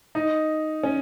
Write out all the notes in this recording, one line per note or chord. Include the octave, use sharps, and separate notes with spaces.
D#4
C#4